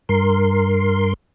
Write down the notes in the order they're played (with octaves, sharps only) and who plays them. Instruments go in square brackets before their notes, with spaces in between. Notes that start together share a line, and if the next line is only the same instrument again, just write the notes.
[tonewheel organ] G2 A#4 C6